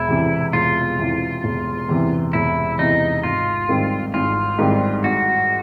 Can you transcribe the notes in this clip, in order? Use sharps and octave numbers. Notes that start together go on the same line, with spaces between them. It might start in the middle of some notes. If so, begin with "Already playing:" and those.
Already playing: E1 E4
E2 C3 E3
E1 F4
E2 C3 E3
E1
E2 C3 E3
E1 E4
E2 C3 E3 D#4
G#1 F4
G#2 D#3 G3 C4
G#1 F4
G#2 D#3 G3 C4
G#1 F#4